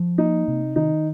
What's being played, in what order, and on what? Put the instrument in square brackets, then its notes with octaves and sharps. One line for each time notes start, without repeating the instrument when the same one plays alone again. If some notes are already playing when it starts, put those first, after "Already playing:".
Already playing: [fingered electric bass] F3
[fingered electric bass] A#3 [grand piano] D#4
[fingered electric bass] C3
[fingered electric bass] D#3 [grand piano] D#4